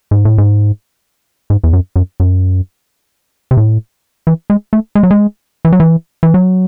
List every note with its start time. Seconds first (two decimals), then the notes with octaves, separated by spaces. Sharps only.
0.11 G#2
0.25 A2
0.38 G#2
1.50 G#2
1.64 E2
1.73 F#2
1.96 F#2
2.20 F#2
3.51 C3
3.57 A2
4.27 E3
4.50 G#3
4.73 A3
4.95 G#3
5.03 F#3
5.11 G#3
5.65 E3
5.73 F#3
5.80 E3
6.23 E3
6.34 F#3